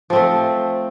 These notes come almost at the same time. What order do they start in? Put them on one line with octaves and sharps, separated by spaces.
F3 C4 A3